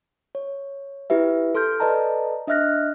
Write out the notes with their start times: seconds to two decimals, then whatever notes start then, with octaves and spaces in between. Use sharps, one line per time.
0.35 C#5
1.10 E4 G4 B4 E5
1.55 A4 C6 F6 G6
1.80 A4 B4 D5 D#5 A5 A#5
2.47 D4 D#5 E5 F6 F#6 A#6